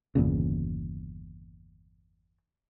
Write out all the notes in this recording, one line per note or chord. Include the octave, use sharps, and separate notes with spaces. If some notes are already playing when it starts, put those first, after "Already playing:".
G1 E2 A#2 C#3